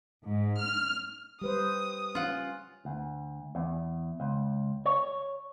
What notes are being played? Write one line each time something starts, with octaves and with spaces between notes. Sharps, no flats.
G#2
F6
G3 B4 C5 D#6
C#4 F4 F#5
D2
E2
C#2
C#5